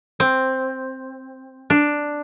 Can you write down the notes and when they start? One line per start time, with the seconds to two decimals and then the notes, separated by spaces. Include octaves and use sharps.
0.20 C4
1.70 D4